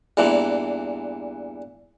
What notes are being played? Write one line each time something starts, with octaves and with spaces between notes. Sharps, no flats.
E2 G2 A#2 E3